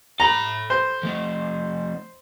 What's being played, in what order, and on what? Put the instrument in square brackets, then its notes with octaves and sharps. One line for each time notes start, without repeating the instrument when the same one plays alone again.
[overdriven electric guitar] A4 B5 [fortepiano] A#5
[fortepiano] C5
[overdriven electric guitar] F3 A3